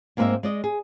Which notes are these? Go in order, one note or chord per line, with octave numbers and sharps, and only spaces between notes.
G#2 A#3 C4 B4 D#5 E5
G#3 D5 D#5
G#4